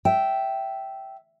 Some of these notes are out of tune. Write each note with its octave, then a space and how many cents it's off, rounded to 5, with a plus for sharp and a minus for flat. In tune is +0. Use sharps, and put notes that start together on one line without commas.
E5 +0 G5 -10